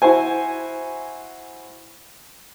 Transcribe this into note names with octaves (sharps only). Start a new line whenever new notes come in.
E4 F#4 C5 G#5